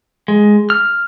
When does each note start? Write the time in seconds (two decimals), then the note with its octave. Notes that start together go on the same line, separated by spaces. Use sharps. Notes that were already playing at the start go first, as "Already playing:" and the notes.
0.28 G#3
0.70 F6